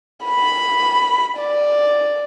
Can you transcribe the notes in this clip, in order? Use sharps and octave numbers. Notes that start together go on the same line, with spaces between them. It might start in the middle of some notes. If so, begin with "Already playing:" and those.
B5
D5